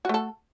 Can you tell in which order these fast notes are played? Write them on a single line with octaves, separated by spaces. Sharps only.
F#4 A3 A4